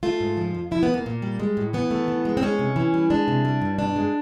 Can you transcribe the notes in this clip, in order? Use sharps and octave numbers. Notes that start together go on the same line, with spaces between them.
A3 F4
G#2
F3
F2
F3 E4
B3
E2
A#3
A#2
G3
G#3
A2
E3 B3
A3
E3
G#3
C4
G#3 C#4
C3
E3
G3
G#3 D4
C3
G3
G2
B2 D4
G#3